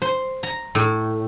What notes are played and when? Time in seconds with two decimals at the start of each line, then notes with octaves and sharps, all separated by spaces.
0.02 C5
0.43 A#5
0.75 A2